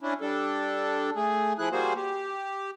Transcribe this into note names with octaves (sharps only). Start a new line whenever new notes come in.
C#4 D4 E4
G3 D4 A4
A3 G#4
F3 E4 G#4 F#6
G3 A#3 F#4 G#4 C5
G4